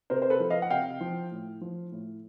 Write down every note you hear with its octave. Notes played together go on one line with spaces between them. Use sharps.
C3 A#4 C5
C5
A4 B4
F3
D#5 F5
F#5
C3 F5 G5
F3
A2
F3
A2